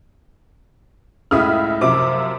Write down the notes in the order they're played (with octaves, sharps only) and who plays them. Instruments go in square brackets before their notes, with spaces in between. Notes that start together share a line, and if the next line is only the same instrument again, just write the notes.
[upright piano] C#2 A2 C#3 [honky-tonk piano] E5 D#6 F6
[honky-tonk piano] F#2 C3 F3 [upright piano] D6